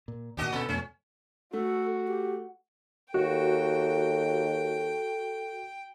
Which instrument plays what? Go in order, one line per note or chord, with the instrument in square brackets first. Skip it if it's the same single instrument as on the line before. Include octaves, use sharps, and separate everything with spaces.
[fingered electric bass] A#2
[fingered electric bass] D#2 A#2 [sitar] D4 F#4 D#5
[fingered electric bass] B2 C#4 [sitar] A#3 A4
[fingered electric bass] F2 B2 A3 [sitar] C#4
[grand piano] A3 [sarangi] F#4 [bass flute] A4
[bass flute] G4
[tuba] D#2 [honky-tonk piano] F#4 [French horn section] A4 [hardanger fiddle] G5